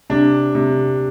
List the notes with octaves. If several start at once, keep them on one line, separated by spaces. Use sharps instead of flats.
C3 D4
C3